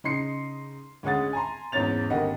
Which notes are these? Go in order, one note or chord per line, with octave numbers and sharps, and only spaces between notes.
C#3 D#4 C6 C7 C#7
D2 G#3 C#4 F#5 D#6 A6
G#5 A#5 C6
E2 G#2 C#4 C#5 A6 F7
G#1 D3 A#3 G4 D#5 F#5